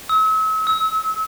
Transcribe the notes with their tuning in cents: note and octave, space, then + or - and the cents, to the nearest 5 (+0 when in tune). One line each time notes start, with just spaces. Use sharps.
E6 -40
E6 -30